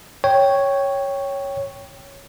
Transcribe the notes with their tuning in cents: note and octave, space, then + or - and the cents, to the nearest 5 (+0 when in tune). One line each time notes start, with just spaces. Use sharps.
C#5 +0 G5 +0